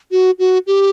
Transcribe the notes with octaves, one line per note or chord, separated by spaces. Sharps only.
F#4
F#4
G4